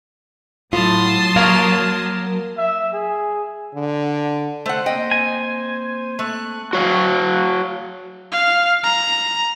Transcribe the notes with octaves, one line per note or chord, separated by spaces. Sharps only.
A2 F#3 F4 A5 C6 D#6
A#3 A#4 C#5 F5
E5
G#4
D3
A3 C5 F#5
A#3 C4 D#5 G5
G#5
A3 F#6
F#4 C#5 F5
F5
A#5